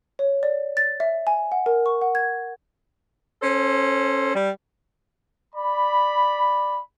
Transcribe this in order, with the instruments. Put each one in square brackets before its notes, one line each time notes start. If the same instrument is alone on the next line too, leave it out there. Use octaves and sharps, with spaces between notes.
[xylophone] C#5
D5
A6
E5
G#5
F#5
A#4
C#6
F#5
G#6
[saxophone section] C#4 A4 C5
G3
[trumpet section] D5 B5